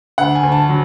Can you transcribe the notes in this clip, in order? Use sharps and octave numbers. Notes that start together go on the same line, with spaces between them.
D2 F#5
G#5
D2
A5
F#3